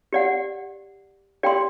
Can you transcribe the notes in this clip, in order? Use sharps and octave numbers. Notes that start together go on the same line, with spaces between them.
G4 D5 F#5
G4 D5 G5 C6